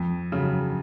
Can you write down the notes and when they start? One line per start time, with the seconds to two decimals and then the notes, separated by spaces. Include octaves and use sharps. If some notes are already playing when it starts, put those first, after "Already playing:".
Already playing: F2
0.32 C#3 F#3